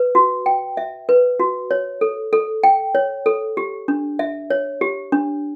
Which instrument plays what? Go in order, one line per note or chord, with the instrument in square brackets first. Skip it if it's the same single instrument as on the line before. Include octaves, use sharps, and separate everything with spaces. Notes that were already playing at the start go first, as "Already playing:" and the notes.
Already playing: [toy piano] B4
F#4
G5
E5
B4
F#4
C#5
A4
A4
G5
C#5
A4
G4
D4
E5
C#5
G4
D4